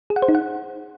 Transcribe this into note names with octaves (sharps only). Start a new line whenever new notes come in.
G#4
F#5
C5
D#4
F#5